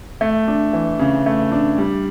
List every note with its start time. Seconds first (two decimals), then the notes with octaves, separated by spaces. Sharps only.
0.21 A3
0.48 D4
0.73 E3
0.99 C#3
1.26 A3
1.52 D4
1.78 G3